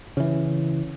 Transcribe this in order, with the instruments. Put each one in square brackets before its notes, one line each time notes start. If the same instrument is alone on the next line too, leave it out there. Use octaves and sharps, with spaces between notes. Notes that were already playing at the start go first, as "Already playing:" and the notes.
[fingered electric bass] C#3 E3